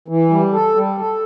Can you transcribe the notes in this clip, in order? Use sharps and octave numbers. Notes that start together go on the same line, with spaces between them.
E3
G3
A4
G3
A4